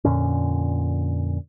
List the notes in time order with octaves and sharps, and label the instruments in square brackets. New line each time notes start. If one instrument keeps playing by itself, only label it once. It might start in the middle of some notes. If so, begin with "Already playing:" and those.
[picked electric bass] F2 A#2 D3 C#4